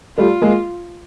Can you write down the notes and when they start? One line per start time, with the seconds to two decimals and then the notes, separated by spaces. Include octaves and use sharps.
0.18 G3 A3 F4
0.42 G#3 A#3